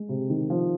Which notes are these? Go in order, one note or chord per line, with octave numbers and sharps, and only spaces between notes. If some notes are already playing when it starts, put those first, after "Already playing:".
Already playing: G#3
C3
D#3
F3